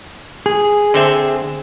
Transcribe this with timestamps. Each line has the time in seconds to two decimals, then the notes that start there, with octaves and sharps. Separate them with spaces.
0.46 G#4
0.94 D3 C4 E5